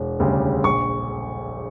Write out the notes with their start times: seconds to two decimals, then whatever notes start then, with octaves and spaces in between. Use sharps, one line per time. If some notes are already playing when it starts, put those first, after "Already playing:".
Already playing: E1
0.20 D2 C#3 G3
0.64 A#1 C#6